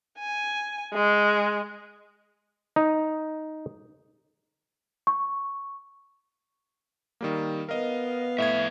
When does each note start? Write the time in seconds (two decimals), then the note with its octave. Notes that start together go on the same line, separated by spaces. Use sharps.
0.18 G#5
0.93 G#3
2.76 D#4
5.07 C#6
7.21 D#3 G3 A#3
7.69 B3 A#4 D#5 F5
8.38 F2 A2 G3 E5 G#6